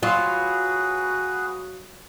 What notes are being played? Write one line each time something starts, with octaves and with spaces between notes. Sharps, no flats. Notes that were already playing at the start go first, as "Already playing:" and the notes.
F#3 F4 F#4 G#4 B4